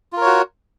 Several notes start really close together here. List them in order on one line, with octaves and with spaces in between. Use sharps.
F4 A#4 C#5 F#4